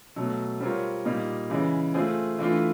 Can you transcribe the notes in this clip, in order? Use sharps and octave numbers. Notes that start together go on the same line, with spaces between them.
B2 F#3 A3
G3 C4 F4 A#4 C#5
A#2 G3 A#3 D#4
C#3 E3 G#3
A3 C4 F4 G#4
E3 A3 D4 F4